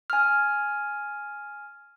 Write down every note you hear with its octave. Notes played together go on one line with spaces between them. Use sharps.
G#5 F6